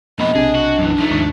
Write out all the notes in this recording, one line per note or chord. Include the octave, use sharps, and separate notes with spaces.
F2 B2 A#3 D#5 B5
B1 C3 D4 G#4
F#4
F#2 E3
F3 A3 D#4
D#2 G#2 D4 C#6